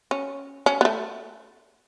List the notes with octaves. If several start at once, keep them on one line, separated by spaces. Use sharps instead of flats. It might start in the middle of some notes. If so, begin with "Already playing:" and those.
C#4
C#4
B3
A3